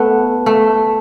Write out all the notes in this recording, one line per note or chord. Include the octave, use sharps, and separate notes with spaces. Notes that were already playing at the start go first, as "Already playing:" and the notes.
Already playing: A3 B3
A3